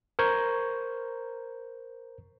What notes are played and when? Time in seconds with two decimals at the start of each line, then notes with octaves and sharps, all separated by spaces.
0.19 A#4 C5 A#5 C#6 G6 G#6